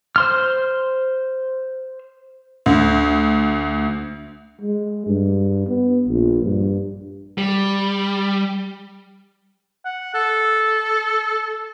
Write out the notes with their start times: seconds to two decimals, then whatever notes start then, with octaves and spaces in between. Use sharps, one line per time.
0.16 C5 C6 F6
2.66 D2
4.61 G#3
5.06 G2
5.67 B3
6.08 A#1
6.44 G2
7.38 G3
9.85 F#5
10.14 A4